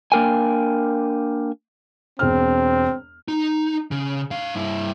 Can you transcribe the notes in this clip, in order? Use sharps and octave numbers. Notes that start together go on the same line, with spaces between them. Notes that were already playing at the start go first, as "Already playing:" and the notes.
A#3 D4 A#4 G5 G#5
E1 C4 F6
D#4
C#3
D4 F5
G2 E4